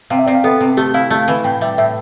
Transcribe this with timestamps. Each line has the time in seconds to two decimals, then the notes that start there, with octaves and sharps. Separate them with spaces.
0.10 C3 F5
0.19 E5
0.27 C3 D5
0.35 F5
0.44 B3 A4
0.61 C3
0.77 A3 G4
0.94 E4 F5
1.10 A3
1.28 E3
1.44 A2 G5
1.61 G3 E5
1.78 A2 E5